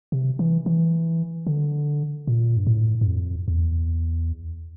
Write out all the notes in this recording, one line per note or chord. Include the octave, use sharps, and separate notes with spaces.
C3
E3
E3
D3
A#2
G2
A2
G2
F2
E2